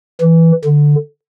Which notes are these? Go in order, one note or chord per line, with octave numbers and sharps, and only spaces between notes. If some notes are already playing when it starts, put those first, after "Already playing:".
E3
D3